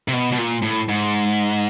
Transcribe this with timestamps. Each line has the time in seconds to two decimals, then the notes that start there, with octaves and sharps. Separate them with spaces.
0.08 C3
0.13 B2
0.32 B2
0.38 A#2
0.63 A2
0.89 G#2